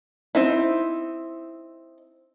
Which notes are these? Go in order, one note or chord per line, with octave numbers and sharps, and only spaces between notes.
C4 D#4 E4